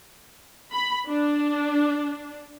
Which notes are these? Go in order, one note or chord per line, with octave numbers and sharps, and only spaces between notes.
B5
D4